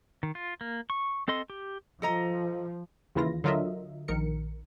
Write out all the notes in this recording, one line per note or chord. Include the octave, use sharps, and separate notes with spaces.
D#3
F4
A#3
C#6
C4 A4 D#5 C6
G4
F3 A4 D#5 A#5
D#2 C#3 E3 E4 F4 A#6
D3 F#3 F4 A#4 D#5 E5
A#1 D#3 A#4 C#7